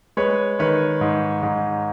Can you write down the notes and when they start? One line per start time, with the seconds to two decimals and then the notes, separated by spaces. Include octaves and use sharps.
0.17 G#3 B4 C#5
0.59 D#3 B4 C#5
1.01 G#2
1.43 G#2